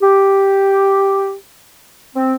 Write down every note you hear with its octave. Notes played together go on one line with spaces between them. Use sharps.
G4
C4